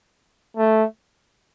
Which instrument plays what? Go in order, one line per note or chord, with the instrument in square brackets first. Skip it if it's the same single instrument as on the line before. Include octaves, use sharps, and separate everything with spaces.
[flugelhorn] A3